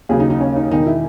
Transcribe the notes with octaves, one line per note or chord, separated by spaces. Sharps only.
D#2 C#3 F#3 G#4
D#4
D#4
C#4
D#4
E1 E2 D#3 D#4
E4